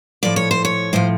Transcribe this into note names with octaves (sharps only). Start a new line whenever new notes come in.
A2 F3 D5
C#5
C5
C#5
A2 F3 C5